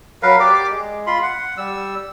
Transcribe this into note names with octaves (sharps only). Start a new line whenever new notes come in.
F#3 A#4 B4 F5
G4 D5 D6
G#3
F4 B5 C6
F#5
G3 E6